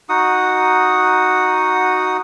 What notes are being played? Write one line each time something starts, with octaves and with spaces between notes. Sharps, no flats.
D#4 F#4 F#5 D#6